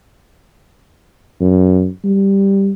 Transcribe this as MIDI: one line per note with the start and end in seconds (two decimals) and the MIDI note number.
1.40 1.88 42
2.04 2.72 55